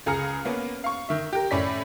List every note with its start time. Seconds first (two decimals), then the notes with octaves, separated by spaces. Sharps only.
0.06 C#2 G#4 A#5 F6 C#7
0.45 A#3 B3 C#4
0.84 F5 C#6
1.09 D#3 E5
1.33 G4 A#4
1.51 A2 C#4 D5 B6